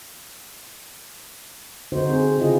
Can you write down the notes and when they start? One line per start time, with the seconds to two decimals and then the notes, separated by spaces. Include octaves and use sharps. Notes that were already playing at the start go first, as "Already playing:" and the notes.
1.92 D3 D#4 F#4 C5
2.08 C4 G#4 C5
2.38 C#3 E4 F4 G#4 D#5